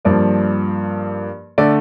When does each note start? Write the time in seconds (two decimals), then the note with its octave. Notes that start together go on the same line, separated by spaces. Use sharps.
0.05 G2 F3 A#3 D5
1.58 D3 A3 D5